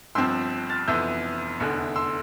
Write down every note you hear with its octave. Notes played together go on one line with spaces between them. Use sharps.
G1 G2 F3 C4 C6 E6
F6 A6
F1 F2 E3 B3 E4 E6 G6
F1 E2 D3
C6 E6